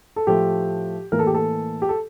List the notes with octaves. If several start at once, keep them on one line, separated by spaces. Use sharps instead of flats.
A4
A2 F3 A3 G4
A2 E3 A#3 A#4
A4
G4
A4
G4
A4